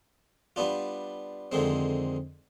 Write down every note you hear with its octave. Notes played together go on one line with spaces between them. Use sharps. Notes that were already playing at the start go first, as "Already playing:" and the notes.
G3 B3 D4 F4
F2 D3 D#3 G#3 C4